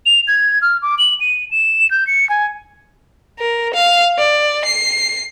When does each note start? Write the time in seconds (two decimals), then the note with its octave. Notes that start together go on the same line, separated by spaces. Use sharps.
0.06 F7
0.28 G#6
0.62 F6
0.82 D6
0.98 F#7
1.20 D#7
1.51 E7
1.91 G6
2.07 C#7
2.30 G#5
3.39 A#4
3.74 F5
4.18 D5
4.65 C7